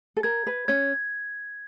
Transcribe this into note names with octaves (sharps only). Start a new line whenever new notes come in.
A4
A#4 G#6
B4
C#4 C#5 G#6